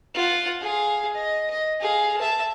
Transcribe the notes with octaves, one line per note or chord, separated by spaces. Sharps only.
F4 F#5
G#4 F5
D#5
D#5
G#4 F5
E5 A5